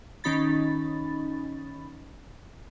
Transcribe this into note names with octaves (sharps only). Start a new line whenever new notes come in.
D#3 C#4 D#4 B5 A6